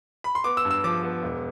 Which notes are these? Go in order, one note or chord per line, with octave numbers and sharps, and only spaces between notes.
B5
C6
B3 D6
E6
G2
E6
F3 D6
B3
E1